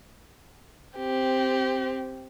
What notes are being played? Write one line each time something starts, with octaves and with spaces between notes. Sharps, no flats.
C4 G4